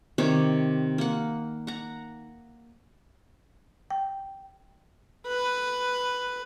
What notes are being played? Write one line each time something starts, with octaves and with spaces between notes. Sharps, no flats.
C3 D#3 C#5 D5
A#3 F#5
F#5 A#5
G5
B4